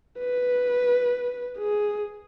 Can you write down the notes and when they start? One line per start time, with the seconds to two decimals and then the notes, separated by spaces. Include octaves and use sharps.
0.20 B4
1.59 G#4